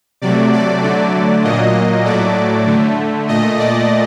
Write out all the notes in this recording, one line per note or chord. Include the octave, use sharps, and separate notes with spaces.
C3 F#3 A3 D5
D5
D3 F#3 A3 D5
A#2 F#3 A#3 D#5
A2 F#3 A3 D5
D3 A3
A#2 A3 D#5
D5